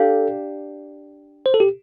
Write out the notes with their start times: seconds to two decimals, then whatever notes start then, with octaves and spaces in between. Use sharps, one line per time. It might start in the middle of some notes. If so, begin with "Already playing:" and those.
Already playing: D4 G4 A4 F5
1.46 C5
1.54 A4
1.60 G4